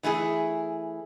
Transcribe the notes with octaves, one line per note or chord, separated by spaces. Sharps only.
E3 A3 E4 G#4